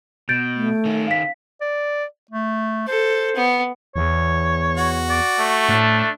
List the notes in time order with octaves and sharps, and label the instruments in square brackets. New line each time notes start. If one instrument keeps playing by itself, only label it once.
[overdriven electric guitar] B2 [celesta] G6 A6 D7
[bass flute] A3
[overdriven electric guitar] D#3 C#4
[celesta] F5 B6
[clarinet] D5
A3
[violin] A4 [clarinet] C5
[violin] B3
[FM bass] E2 [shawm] C#5
[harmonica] F#4
[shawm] D5
[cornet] A3
[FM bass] A2 [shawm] D4